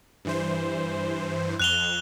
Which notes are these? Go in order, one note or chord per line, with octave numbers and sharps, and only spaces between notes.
G2 E3 C5
F2 F#6 E7 F7 G7